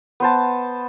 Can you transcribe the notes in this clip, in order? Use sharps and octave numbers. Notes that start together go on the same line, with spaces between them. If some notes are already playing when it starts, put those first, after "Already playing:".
B3 C5 A5